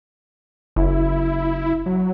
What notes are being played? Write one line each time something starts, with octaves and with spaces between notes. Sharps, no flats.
F#1 E4
F#3